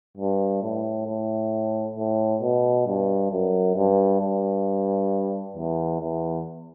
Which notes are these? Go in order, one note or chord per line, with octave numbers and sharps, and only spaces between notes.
G2
A2
A2
A2
B2
G2
F#2
G2
G2
E2
E2